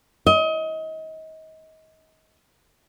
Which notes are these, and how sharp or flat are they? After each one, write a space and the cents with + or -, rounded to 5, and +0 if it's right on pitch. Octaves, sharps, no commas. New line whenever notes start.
D#5 +30